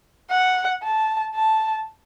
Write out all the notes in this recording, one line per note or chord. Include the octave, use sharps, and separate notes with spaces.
F#5
A5
A5